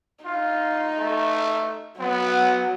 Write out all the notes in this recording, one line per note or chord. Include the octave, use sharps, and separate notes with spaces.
D#4 F4
A3
F#3 B3